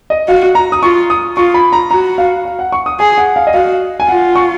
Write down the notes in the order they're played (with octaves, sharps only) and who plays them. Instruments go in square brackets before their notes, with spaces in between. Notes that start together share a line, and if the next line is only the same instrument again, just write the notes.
[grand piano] D#5
[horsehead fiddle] F#4 [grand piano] F5
[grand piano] A#5
D#6
[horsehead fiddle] F4 [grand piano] C#6
[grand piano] D#6
[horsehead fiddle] F4 [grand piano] C#6
[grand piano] B5
A#5
[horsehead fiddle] F#4 [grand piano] A#5
[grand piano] F5
F5
F#5
C#6
D#6
[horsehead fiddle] G#4 [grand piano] G#5
[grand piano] F#5
F5
D#5
[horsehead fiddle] F#4 [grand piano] F5
[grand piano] G#5
[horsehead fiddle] F4 [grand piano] F#5
[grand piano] C#6